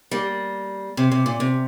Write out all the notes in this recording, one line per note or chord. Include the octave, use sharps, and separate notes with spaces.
G3 A#3
C3
C3
A#2
C3